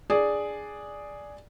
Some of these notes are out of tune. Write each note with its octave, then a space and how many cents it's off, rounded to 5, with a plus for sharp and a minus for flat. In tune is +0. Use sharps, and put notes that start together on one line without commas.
D4 +0 G#4 +0 D5 +0